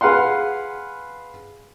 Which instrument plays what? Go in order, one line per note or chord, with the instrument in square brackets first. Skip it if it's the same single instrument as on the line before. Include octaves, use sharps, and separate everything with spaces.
[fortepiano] G#4 B4 F5 F#5 C6